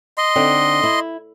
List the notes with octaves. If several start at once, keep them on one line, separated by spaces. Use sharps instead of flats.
D#5 C6
D3 C4 D#4
E4